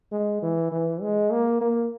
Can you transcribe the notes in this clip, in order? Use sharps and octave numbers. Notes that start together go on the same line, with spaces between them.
G#3
E3
E3
G#3
A#3
A#3